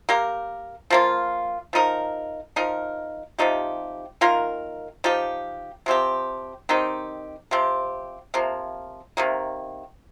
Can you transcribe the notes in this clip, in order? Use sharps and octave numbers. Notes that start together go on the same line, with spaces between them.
A#3 G4 A#4
F3 A#3 F4
F3 D#4 A#4
F3 D#4 A#4
C3 F3 D#4 G4
D#3 A#3 F4 A#4
F3 D#4 G4
C3 F3 C4 G4
D#3 C4 D#4 G4
C3 F3 C4 G4
C3 F3 A#3
C3 D#3 A#3